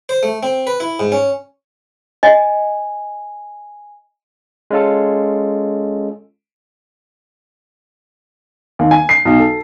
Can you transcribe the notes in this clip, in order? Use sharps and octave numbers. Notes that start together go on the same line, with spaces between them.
C5
A3
C4
B4
E4
G#2
C#4
D#5 G#5
G#3 C#4 F4 A4
D#2
G#5
C7
B1
A4